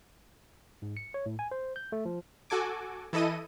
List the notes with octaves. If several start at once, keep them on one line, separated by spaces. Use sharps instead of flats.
G#2
C#7
C#5
A2
G#5
C5
G6
A3
F3
F#4 A4 G#5 D6
E3 E4 A4 D#5 D#7